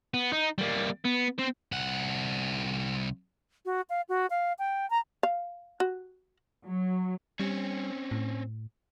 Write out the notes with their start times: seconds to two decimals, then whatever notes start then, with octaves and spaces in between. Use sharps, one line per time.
0.14 B3
0.32 D#4
0.58 G3 A#3
1.05 B3
1.38 C4 C5
1.72 C2 F#5
3.65 F#4
3.90 F5
4.09 F#4
4.30 F5
4.59 G5
4.90 A#5
5.23 F5
5.80 F#4
6.65 F#3
7.40 G3 C4 C#4
8.11 A2